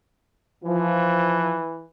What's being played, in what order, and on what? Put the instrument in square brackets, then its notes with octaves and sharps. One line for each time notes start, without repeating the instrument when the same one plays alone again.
[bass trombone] E3 [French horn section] F3